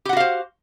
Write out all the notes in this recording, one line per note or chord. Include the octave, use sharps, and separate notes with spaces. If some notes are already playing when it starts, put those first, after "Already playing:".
F#4 G4 C5 F5 F#5